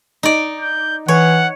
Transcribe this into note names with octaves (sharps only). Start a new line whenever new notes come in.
D#4 D5
G6
E3 C#5 F#5